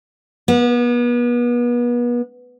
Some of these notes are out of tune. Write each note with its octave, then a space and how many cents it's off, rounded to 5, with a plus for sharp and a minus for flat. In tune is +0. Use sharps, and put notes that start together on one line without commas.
B3 -35